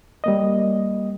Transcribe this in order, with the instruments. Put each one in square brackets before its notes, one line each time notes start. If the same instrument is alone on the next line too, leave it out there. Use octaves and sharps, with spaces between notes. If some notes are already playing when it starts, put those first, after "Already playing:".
[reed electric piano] G3 A#3 D#5